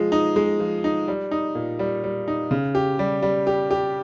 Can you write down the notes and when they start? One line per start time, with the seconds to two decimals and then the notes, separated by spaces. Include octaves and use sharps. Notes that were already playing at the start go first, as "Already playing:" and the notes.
Already playing: F3 G#3
0.12 D#4
0.36 G#3
0.60 F3
0.84 D#4
1.08 G3
1.31 D#4
1.55 A#2
1.79 G3
2.04 G3
2.28 D#4
2.51 C#3
2.75 G4
2.99 G3
3.22 G3
3.47 G4
3.71 G4